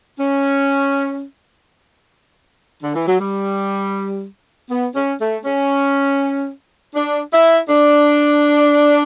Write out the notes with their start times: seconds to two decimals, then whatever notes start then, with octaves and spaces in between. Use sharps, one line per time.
0.19 C#4
2.83 D3
2.94 E3
3.07 F#3
3.19 G3
4.70 B3
4.95 C#4
5.20 A3
5.45 C#4
6.95 D4
7.32 E4
7.69 D4